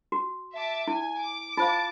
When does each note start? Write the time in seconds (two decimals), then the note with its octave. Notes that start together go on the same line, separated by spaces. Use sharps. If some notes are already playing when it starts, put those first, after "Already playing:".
0.12 F#4
0.54 E5 A5 D6
0.87 E4 G#5
1.19 D6
1.57 F4 C5 F5 A5